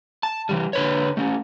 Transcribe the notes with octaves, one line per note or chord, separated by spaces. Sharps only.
A5
E3 F3 G3
D3 B4 C#5
A3 C#4